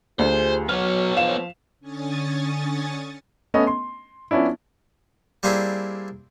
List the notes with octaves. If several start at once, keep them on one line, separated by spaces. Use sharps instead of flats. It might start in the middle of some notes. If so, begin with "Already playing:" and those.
D2 F4 G4 G#4 C5
F#3 B3 C#5 F6
F3 F5 E7
D3 C#4 G#5 C#6 D#6 A6
A3 B3 C#4 D#5
C6
F3 B3 C#4 D4 E4
G3 A#3 C4 D4 E4 G#4